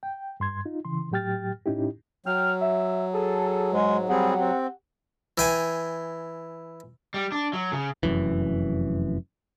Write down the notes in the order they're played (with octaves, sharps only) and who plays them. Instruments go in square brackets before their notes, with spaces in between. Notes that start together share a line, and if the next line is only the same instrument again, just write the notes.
[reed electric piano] G5
G2 C6 G#6
D#4 F4
C#3 E3 C6
A2 F#3 G4 G5 F6 A6
A2 C#4 D#4 E4 G4
[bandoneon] F#3 [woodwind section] G5 F6
[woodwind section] E5
G#4 A4
[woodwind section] G#2 [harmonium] G#3
[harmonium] G3 C4 G#4 [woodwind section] G4 F#5
[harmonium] C4
[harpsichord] E3 G5 G#5
[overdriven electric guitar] G3
D4
F#3
C#3
[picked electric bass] F1 F#2 E3